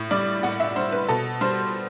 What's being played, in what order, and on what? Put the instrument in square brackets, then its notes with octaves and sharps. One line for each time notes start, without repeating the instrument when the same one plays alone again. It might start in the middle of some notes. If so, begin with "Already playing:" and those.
Already playing: [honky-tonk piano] A2
G3 D5
A2 F#5
E5
G3 C5
B4
B2 A4
G3 C5